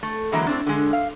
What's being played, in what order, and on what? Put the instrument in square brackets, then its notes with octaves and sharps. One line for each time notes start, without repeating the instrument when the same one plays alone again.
[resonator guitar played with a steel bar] A3
D3 E3 F#3 G#3 A#3
A2 C4 D4
D3 G#3
F5